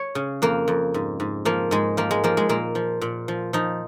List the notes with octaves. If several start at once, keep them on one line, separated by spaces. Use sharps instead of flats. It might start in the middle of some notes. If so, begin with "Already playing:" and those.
Already playing: C#5
C#3
F2 A#3
F2
G#2
G#2
F3 A#3
G#2 G#3
F3 A#3
G#3
F3 A#3
G#3
A#2 A#3
F3
A#2
F3
F3 D#4